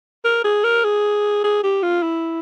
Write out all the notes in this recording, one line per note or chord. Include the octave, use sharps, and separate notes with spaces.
A#4
G#4
A#4
G#4
G#4
G4
F4
E4